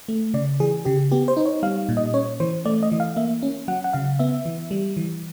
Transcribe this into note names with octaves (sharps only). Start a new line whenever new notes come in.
A3
C#3 D5
E3 G#4
C#3 G4
B3 G4
C5
D#4
C#5
G3 F5
A#2
D#5
C#4 C#5
E3 C5
A3 D5
D#5
E3
F5
A#3 E5
C#4
F#3 F#5
F#5
C#3 F5
B3 E5
E3
G3
E3